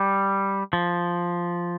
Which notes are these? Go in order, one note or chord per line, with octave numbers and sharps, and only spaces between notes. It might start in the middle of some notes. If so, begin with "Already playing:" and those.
Already playing: G3
F3